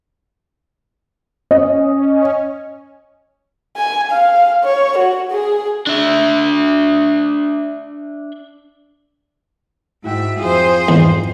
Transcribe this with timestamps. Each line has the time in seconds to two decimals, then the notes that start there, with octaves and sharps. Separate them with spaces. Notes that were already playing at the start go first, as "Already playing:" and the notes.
1.51 C#4 D#5
3.77 G#5
4.10 F5
4.64 C#5
4.98 F#4
5.31 G#4
5.87 D4 E5
10.04 G#2 E4 F#4 E5 G5
10.39 F2 F4 G#4 C5
10.89 E2 G#2